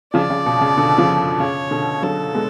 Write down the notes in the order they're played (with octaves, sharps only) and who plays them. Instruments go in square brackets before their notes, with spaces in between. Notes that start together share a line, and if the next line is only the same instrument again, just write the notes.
[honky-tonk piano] C#3 F3 [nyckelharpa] D5
[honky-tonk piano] C#3
B2
C#3
B2 D3
C#3 F3
[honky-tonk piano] C#3 [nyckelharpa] C#5
[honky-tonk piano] B2 D3
[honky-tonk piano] D3 F#3 [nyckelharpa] A4
[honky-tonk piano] G#3 B3